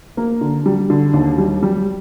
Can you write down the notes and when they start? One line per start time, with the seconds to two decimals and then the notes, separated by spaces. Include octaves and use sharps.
0.17 A#3
0.41 D3
0.66 G3
0.90 D3
1.13 D#2
1.38 G3
1.63 G3